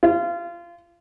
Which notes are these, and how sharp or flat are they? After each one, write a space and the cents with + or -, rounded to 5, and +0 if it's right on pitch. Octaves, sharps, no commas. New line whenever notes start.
F4 -25